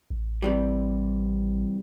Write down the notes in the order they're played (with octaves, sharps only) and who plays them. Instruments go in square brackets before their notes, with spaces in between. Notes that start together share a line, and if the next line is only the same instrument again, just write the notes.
[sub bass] A1
[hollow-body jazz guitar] C3 E3 G3